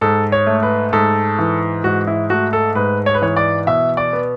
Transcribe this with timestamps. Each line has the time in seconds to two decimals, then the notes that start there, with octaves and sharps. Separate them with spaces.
0.01 G#2 A4
0.32 C#5
0.47 A3
0.63 B4
0.93 G#2 A4
1.39 E3
1.84 G#2 F#4
2.07 E4
2.30 A3 F#4
2.53 A4
2.75 G#2 B4
3.06 C#5
3.14 B4
3.22 E3 C#5
3.37 D5
3.67 B2 E5
3.97 D5
4.13 B3